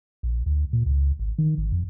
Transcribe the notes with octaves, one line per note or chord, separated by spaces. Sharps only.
A#1
D2
A#2
C#2
G#1
D#3
G#1
F2